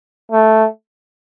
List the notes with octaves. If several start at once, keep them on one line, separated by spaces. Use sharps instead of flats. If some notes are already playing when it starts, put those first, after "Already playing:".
A3